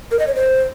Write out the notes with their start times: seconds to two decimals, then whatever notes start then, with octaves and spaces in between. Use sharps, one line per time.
0.11 A#4
0.19 D#5
0.27 C#5
0.35 C5